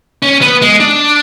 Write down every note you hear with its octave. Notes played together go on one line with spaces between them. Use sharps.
C#4
B3
G#3
D4